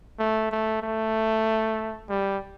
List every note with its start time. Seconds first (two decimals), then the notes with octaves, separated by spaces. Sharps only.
0.19 A3
0.52 A3
0.82 A3
2.09 G3